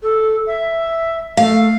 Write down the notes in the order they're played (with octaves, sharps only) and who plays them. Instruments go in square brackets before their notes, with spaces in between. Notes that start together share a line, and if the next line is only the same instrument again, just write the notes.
[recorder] A4
E5
[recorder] A3 [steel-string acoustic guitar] F5